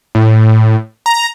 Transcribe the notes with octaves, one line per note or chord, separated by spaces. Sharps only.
A2
A#5